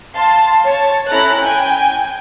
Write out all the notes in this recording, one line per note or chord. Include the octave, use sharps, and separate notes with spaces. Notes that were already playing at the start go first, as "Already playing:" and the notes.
F5 A5 C6
C#5 A5
C#4 E4 A4 A#5 F#6
G5 G#5